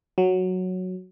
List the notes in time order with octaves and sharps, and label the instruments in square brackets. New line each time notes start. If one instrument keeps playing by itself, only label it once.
[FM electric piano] F#3